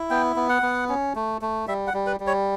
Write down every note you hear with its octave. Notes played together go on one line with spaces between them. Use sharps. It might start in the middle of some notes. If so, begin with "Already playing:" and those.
Already playing: E4
B3 G5
B3
F#5
B3
C#4
A3
A3
G3 E5
F#5
G3
B4
G3
C#5